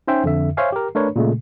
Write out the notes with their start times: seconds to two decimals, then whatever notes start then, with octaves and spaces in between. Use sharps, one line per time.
0.08 C#4 D#4 C5 E5 G5 G#5
0.24 F2 D3 E5
0.57 C5 C#5 E5 F5 G#5
0.72 G4 A#4
0.95 A3 D4 A#4 B4 C#5
1.16 A#2 C#3 G#3 A3